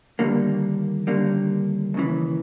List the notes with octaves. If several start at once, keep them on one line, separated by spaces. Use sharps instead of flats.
D#2 D3 G3 A#3
D#2 D3 G3 A#3
D#2 C#3 E3